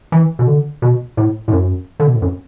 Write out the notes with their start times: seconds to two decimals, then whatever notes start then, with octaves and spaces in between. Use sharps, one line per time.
0.12 E3
0.39 B2
0.47 D3
0.82 B2
1.17 A2
1.48 A2
1.52 F#2
2.00 D3
2.07 B2
2.15 A2
2.22 F#2